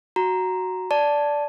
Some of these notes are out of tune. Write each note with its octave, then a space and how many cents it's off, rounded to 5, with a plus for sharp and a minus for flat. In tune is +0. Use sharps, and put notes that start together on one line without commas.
F#4 +0 A#5 +0
D5 -10 A5 +0